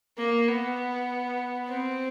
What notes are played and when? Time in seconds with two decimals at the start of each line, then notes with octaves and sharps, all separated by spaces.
0.18 A#3
0.48 B3
1.68 C4